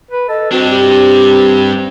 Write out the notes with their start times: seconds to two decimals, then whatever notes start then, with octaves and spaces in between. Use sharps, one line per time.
0.11 B4
0.29 A4 D#5
0.52 G2 C4 D4 F#4
0.70 G4